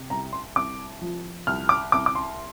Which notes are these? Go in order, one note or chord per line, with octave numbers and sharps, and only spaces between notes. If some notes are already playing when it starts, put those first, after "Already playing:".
Already playing: C3
C2 A#5
C6
C2 D6
F3
C2 F6
D6
C2 D6
D6
C6